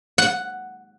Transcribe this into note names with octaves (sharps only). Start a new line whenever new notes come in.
F#5